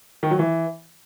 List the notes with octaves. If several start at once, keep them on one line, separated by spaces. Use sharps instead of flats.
D#3
F#3
E3